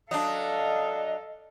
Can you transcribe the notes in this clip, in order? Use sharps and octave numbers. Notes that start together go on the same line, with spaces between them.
F#3 D4 A4 D#5 F5